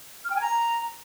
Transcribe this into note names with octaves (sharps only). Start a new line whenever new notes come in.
F6
G5
G#5
A#5